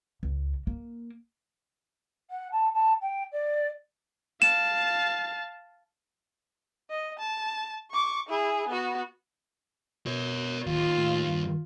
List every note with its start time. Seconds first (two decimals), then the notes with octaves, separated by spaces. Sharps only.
0.23 C#2
0.67 A#3
2.30 F#5
2.52 A5
2.74 A5
3.01 G5
3.32 D5
4.42 F5 A5 E7
6.90 D#5
7.19 A5
7.91 C#6 D6
8.29 E4 G#4
8.68 B3 F#4
10.07 B2 A#4 C#5
10.66 D1 D#2 F4
10.97 A2
11.27 G2